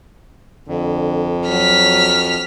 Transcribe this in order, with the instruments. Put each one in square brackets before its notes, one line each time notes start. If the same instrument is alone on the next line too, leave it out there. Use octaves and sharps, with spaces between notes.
[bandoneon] F2 [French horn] D3
[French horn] F#3 [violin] F6 B6